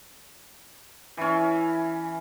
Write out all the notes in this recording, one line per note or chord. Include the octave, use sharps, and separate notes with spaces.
E3 C#4